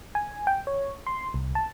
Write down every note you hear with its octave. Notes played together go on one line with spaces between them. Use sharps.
G#5
G5
C#5
C6
C2
A5